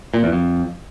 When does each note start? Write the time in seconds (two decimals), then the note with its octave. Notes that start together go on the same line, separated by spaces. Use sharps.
0.14 A#2
0.23 E2
0.32 F2